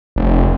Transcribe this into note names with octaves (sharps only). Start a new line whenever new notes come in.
F1